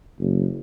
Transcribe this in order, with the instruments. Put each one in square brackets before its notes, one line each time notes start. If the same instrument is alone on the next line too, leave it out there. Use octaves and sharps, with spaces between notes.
[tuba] F#1